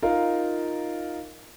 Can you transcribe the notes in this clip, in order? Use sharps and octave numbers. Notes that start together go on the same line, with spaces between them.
D#4 F4 A#4 F5